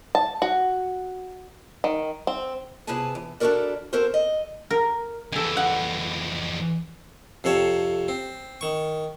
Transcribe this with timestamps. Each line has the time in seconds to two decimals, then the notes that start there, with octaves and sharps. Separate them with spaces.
0.15 A5
0.42 F#4
1.84 D#3
2.27 C4
2.87 C3 B3 E4 G#4 G#5 A5
3.15 E3
3.40 D4 E4 F#4 A4 A#4 D5
3.93 C4 F#4 A4 A#4 C5
4.14 D#5
4.70 A#4
5.32 F2 E3 A4 G#5
5.57 F#5
7.44 F2 C3 A4 C#5
8.08 C4
8.61 D#3 C#6